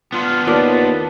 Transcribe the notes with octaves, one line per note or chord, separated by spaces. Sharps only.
B3 D4 F4
D#2 F4 A#4 B4 D5 A5